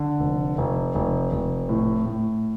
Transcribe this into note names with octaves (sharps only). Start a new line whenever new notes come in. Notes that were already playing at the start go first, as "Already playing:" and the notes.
Already playing: D3
F1
F1
F1
F1
A2
A2